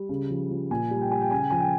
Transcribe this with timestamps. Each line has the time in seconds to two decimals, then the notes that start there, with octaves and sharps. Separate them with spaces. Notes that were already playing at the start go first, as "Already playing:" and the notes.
Already playing: G3
0.09 C#3
0.30 F3
0.50 F3
0.70 A#2 G#5
0.91 G3
1.01 G5
1.11 G3 G#5
1.21 G5
1.31 C#3 G#5
1.40 G5
1.50 F3 G#5
1.60 G5